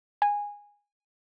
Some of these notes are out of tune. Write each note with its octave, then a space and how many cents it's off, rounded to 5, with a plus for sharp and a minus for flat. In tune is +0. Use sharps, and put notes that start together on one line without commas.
G#5 -15